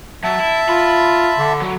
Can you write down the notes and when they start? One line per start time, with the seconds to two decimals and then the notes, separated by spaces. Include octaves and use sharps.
0.24 F#3 E5 A5
0.40 E4
0.69 F4 B5
1.38 D3
1.61 F#3